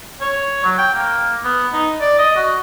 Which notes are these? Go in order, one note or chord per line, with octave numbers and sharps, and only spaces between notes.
C#5
F#3
G5
A#3
B3
D#4
D5
D#5
F#4